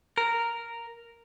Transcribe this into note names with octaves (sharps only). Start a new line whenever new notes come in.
A#4